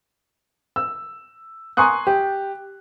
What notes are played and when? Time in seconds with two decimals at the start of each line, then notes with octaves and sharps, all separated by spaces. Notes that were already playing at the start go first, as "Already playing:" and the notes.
0.76 E6
1.77 G#5 A#5 C6 C#6 D#6 F#6
2.07 G4